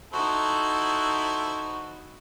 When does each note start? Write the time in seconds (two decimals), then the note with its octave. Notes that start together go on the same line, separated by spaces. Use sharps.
0.13 D#4 E4 F#4 A4 C5